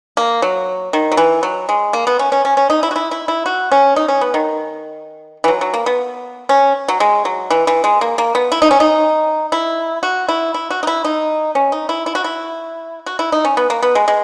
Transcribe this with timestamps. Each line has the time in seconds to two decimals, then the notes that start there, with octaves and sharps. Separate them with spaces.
0.17 A#3
0.42 F#3
0.93 D#3
1.12 F#3
1.17 E3
1.43 F#3
1.69 G#3
1.93 A#3
2.07 B3
2.19 C#4
2.32 C#4
2.45 C#4
2.57 C#4
2.70 D#4
2.83 E4
2.91 F#4
2.96 E4
3.11 E4
3.28 E4
3.46 F#4
3.72 C#4
3.96 D#4
4.08 C#4
4.21 B3
4.34 D#3
5.44 E3
5.48 F#3
5.61 F#3
5.74 A#3
5.86 B3
6.49 C#4
6.88 F#3
7.00 G#3
7.25 F#3
7.50 E3
7.67 E3
7.84 G#3
8.01 A#3
8.18 A#3
8.35 B3
8.52 E4
8.62 D#4
8.71 C#4
8.80 D#4
9.52 E4
10.03 F#4
10.28 E4
10.54 E4
10.70 F#4
10.83 D#4
10.87 E4
11.04 D#4
11.55 C#4
11.72 D#4
11.89 E4
12.06 E4
12.15 F#4
12.24 E4
13.06 F#4
13.19 E4
13.32 D#4
13.45 C#4
13.57 B3
13.70 A#3
13.82 B3
13.95 G#3
14.08 G#3